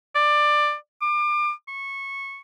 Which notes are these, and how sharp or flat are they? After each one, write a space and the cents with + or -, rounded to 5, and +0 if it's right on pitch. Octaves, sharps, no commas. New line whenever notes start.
D5 +15
D6 +35
C#6 -15